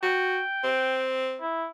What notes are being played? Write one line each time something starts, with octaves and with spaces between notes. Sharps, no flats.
F#4 G5
C4
E4